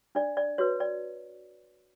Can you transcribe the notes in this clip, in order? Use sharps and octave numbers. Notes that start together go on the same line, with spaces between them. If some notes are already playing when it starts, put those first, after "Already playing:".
D4 D5
D5
F#4 B4 C#5
D5